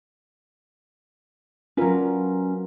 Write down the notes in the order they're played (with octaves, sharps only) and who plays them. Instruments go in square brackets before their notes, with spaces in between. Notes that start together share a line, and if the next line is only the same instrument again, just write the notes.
[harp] F#3 B4 [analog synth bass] C#4 [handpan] D4 F4 A#4